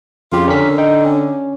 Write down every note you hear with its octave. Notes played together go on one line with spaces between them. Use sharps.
F2 C#3 F4 G4
D3 C#4 A#4 B6
D#4 G5
C#4